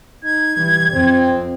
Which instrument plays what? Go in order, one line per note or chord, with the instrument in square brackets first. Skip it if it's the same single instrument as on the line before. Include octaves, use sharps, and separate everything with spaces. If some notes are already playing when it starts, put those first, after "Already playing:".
[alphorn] D#4 [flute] G#6
[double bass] E3 [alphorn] G3
[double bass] F2 [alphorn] C4